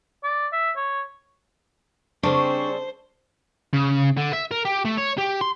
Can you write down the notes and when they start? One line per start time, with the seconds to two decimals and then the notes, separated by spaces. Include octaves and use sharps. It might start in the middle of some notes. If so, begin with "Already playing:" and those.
0.23 D5
0.52 E5
0.76 C#5
2.23 C#3 G3 C4 D4 C5 C#6
3.73 C#3
4.17 D3
4.33 E5
4.51 A#4
4.65 G4
4.85 A3
4.98 C#5
5.18 G4
5.41 C6